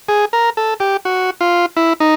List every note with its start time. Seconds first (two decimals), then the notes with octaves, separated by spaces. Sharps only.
0.09 G#4
0.33 A#4
0.57 A4
0.80 G4
1.05 F#4
1.41 F4
1.77 E4
2.00 D#4